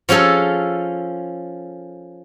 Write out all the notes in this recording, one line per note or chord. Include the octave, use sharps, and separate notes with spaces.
F3 C#4 G#4 A4 C#5